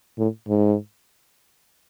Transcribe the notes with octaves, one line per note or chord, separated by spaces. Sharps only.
A2
G#2